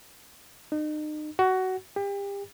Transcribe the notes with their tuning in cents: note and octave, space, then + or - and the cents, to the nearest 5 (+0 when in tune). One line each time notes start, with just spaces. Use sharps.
D#4 -35
F#4 +15
G4 +35